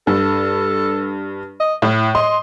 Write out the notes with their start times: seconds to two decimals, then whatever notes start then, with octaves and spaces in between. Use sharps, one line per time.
0.07 G2 A4
1.60 D#5
1.82 A2 E4
2.15 D#5 C6